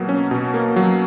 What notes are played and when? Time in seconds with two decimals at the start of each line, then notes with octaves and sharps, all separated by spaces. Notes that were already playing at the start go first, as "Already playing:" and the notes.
Already playing: B2 F#3 A#3
0.09 C#4
0.31 B2
0.54 A#3
0.76 F#3